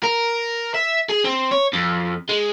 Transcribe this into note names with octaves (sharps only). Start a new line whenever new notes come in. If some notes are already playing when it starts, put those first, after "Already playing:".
A#4
E5
G#4
C4
C#5
F2
G#3